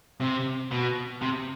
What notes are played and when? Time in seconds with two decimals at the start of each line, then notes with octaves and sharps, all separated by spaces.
0.21 C3
0.71 B2
1.22 C3